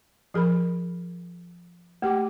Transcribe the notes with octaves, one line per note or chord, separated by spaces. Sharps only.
F3 G#4 A#4 B5
A3 G4 G5 D6